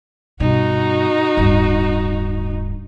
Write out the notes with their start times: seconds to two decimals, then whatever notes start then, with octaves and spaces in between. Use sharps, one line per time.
0.40 G2 B2 D#4 F#4
1.37 D1 G2